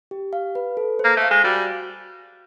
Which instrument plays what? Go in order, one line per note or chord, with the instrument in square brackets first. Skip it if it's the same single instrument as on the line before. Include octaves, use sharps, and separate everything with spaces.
[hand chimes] G4
F5
B4
A4
C5
[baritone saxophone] A#3
[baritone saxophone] A3 [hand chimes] F5
[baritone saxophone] G#3
[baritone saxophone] G3 [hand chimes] F#4